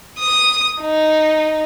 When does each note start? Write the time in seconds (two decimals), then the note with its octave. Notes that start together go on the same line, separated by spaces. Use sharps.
0.20 D#6
0.81 D#4